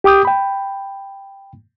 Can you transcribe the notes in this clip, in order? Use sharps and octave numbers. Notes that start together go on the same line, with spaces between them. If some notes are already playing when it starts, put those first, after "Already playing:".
G4 G5 D6 D#6 G6
G5 B5